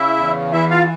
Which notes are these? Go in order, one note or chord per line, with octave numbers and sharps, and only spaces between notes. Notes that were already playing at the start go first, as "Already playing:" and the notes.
Already playing: C#3 E4 E5
E2
E3 E4 E5
F4 F5